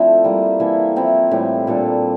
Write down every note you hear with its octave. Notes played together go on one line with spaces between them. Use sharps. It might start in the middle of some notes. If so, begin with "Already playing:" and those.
Already playing: F3 A3 C4 D4 E4
G3 A#3 E4
E3 A#3 E4 A4
F3 C4 E4
A2 E3 G3
A#2 G3 D4 A4